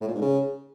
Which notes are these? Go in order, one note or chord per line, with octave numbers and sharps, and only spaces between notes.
A2
A#2
G#2
C#3